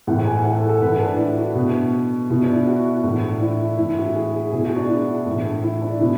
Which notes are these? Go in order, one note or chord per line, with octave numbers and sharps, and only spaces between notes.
A2 E3 F#5
F#5
G#5
F#5
A4
A4
A2 E3 B4
D4
D4
E4
F#4
B2
B2 E4
D4
E4
F#4
A2 E3
D4
E4
A2 E3 E4
F#4
G#4
G#4
B2 G#4
F#4
D4
E4
A2 E3
E4
D4
B2 E4